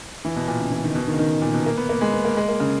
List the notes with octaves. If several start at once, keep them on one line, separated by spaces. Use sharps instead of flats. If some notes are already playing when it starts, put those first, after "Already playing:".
E3
B2
A#2
C#3
E3
D#3
B2
D#3
C#3
D#3
A#2
B2
A#3
B3
A#3
G#3
B3
A#3
G#3
A#3
C#3